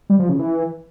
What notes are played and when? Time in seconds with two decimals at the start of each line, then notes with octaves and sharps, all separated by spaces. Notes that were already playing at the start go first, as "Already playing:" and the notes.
0.10 G3
0.19 F3
0.29 C#3
0.39 E3